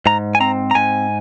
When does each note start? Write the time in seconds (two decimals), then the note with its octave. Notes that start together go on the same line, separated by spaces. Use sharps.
0.06 G#2 A#5
0.35 G#5
0.40 C4 A#5
0.71 A#5
0.75 G#2 G#5